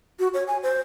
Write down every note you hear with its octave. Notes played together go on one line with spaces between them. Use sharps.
F#4
C#5
G#5
C5